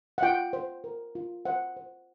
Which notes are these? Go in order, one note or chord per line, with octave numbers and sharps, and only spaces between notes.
F#5
F4 G5
C5
A#4
F4
C5 F#5
C5